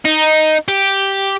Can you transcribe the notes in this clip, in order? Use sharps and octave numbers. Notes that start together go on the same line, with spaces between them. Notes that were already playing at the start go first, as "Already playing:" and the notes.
D#4
G4